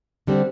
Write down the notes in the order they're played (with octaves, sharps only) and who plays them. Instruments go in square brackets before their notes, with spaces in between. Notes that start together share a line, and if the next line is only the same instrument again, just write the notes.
[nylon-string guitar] D3 G3 C4